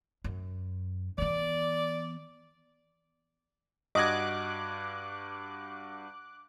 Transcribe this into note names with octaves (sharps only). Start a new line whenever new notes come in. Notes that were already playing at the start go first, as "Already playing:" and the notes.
F#2
E3 B3 D5
G2 F#4 D#5 D6 F#6 G#6